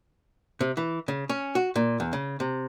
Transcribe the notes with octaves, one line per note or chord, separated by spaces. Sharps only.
C3
E3
C#3
C#4
F#4
A#2
E2
C#3
C3